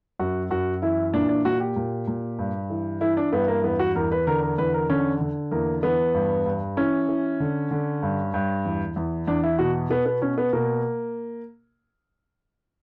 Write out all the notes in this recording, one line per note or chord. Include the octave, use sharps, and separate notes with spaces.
F#2 F#4
F#2 F#4
E3 E4
A#2 D4
D4
A#2 F#4
G4
A#2
A#2
G2
E3
E3 E4
D4
G2 B3
A#3
E2 B3
F#4
E2 A#4
B4
D3 A#4
A#4
E2 B4
A#4
D3 C#4
D3
E2 A#3
E2 B3
G2
G2
E3 C#4
E3
D3
D3
G2
G2
E2
E2
E2 D4
E4
B2 F#4
B2 B3
B3
B2 C#4
B3
B2 A#3